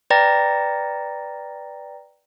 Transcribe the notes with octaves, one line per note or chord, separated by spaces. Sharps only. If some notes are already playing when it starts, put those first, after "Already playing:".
B4 D5 G5 A#5 A6 A#6